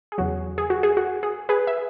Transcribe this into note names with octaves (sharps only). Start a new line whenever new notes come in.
G#4
E2 C#3 F#3 F#4
G#4
F#4
G#4
F#4
G#4
G#4 B4
E5